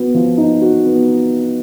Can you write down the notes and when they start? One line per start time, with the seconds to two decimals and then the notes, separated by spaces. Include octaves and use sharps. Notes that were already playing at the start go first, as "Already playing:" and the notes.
Already playing: B3 F#4
0.14 F3
0.37 D#4
0.61 F#4
0.85 B3